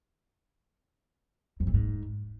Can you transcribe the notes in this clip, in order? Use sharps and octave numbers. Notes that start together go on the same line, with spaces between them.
F2
A2
G#2